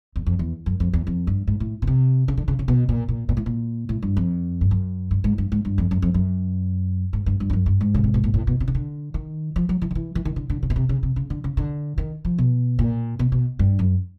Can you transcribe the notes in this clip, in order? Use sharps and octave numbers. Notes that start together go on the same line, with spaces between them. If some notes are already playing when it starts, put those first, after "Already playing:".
E2
F2
E2
F#2
F2
E2
F2
G2
G#2
A2
B2
C3
C#3
D3
C#3
C#3
B2
A#2
A#2
A#2
A2
A#2
A2
G2
F2
G2
F#2
G2
G#2
G2
G#2
G2
F2
F#2
F2
F#2
G#2
G2
G2
F2
F#2
G2
G#2
C#3
C3
B2
A#2
A2
B2
C3
C#3
D3
D#3
F3
F#3
E3
D#3
E3
E3
D#3
D3
D3
C#3
B2
C3
C#3
C3
C#3
D3
C#3
D3
D#3
F3
B2
A#2
B2
B2
G2
F#2